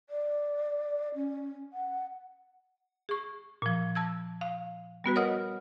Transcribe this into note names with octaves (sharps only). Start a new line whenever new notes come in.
D5
C#4
F#5
G#4 C#6
A#2 F3
A5 E6 G#6
F5
G3 B3 F#4 B4
A#4 C#5 D#5 F#5 D#6 F6